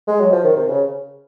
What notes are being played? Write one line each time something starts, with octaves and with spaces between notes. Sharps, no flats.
G#3
F#3
F3
D#3
C3
C#3